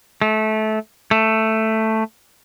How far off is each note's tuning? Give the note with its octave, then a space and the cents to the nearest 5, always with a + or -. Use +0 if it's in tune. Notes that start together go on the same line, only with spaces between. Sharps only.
A3 -20
A3 +5